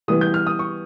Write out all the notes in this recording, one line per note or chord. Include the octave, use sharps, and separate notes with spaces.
E3 G3 B3 D#6
G6
F6
D#6
C#6